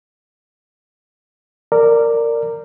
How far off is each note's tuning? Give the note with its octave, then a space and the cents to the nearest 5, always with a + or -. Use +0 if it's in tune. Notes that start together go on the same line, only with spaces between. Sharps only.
A#4 -15 D5 +0